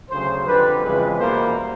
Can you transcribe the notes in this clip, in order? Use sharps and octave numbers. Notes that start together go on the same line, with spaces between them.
D2 C#3 F#3 C5
F2 D3 G3 B4
F2 C#3 E3 G#3 B4
E2 B2 G3 A#3 C5